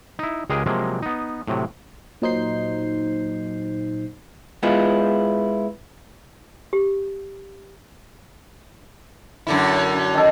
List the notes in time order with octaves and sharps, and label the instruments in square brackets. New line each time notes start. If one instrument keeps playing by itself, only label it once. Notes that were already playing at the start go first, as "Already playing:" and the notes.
[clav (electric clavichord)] D#4 E4
C#2 G#3 G4 G#4 A#4 B4
C3 F3 F#3 G#3 A#3
B3 D#4
A2 C3 F#3
[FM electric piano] A#2 F#3 D#4 C5 G6 C7
[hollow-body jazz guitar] G#3 B3 E4 F4
[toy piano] G4
[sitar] F#2 D3 E4
[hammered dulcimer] D#3 A4